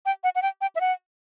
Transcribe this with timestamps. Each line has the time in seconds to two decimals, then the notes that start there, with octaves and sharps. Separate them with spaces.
0.06 G5
0.24 F#5
0.35 F#5
0.42 G5
0.61 G5
0.75 E5
0.81 F#5